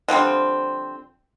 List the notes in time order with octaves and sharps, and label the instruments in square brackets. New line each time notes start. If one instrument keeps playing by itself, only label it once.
[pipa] D3 F3 G3 C4